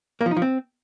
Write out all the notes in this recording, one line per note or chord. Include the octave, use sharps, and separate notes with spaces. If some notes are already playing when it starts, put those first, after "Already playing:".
A#3
F3
D#4
F3
C4